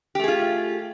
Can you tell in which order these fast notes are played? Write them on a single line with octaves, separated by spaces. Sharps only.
G4 A3 G#4 F4